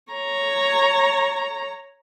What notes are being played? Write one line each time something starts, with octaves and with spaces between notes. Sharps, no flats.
C#5 A#5